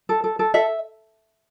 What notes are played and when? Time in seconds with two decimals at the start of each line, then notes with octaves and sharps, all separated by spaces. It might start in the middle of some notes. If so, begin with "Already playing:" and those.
0.09 A4
0.24 A4
0.39 A4
0.54 A4 E5